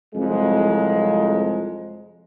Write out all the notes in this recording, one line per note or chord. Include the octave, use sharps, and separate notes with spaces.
C2 F2 F3 F#3 G#3